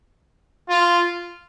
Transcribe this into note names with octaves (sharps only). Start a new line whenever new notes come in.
F4